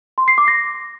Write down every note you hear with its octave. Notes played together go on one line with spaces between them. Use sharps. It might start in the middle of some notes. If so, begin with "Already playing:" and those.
C6
C7
D6
A#6